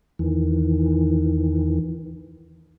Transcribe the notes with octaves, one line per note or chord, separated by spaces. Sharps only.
E2 D#3 E3